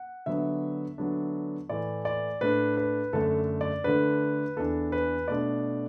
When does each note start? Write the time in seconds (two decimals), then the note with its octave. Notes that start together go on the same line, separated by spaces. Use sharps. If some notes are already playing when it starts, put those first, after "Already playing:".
Already playing: F#5
0.26 D3 F#3 B3 D4 E5
0.98 D3 F#3 B3 D4
1.69 A2 E3 A3 D5
2.05 D5
2.41 A2 A3 D4 B4
2.77 B4
3.13 F#2 D3 A3 D4 A4
3.61 D5
3.84 D3 A3 D4 B4
4.56 E2 E3 D4 A4
4.92 B4
5.28 B2 A3 D4 D5